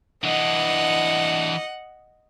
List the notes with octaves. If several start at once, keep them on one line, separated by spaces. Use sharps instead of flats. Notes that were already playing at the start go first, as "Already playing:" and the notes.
E3 D4 D#5 F#5